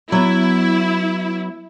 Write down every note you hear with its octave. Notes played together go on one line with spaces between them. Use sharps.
F#3 B3 E4